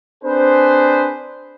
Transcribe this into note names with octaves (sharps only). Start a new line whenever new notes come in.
C4 D4 G#4 B4 C5